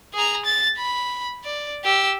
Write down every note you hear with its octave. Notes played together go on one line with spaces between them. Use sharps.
G#4 A#5
A6
B5
D5
G4 E6